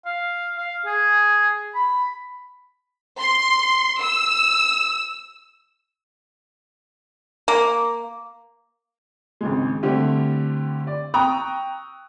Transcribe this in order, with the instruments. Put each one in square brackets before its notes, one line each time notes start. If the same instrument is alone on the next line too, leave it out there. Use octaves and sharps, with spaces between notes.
[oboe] F5
F5
G#4
B5
[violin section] C6
E6
[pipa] A#3
[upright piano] G#1 C#2 G#3
D3 G3 A3 C4 E4 G4
D5
G5 A#5 C#6 D#6 E6 F#6